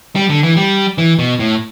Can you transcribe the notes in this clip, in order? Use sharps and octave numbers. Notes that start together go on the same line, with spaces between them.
G3
D3
E3
G3
E3
B2
A2